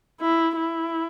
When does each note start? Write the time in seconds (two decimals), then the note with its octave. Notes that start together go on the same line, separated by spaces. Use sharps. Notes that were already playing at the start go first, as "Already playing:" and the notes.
0.21 E4
0.56 E4